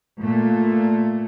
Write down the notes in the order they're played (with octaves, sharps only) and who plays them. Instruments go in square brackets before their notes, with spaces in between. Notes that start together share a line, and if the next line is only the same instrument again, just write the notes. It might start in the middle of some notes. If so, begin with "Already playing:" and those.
[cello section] A#2 A3